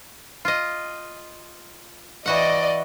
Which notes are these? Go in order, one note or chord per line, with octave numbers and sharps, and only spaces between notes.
F4 D#5
E3 F#4 D5 D#5 F#5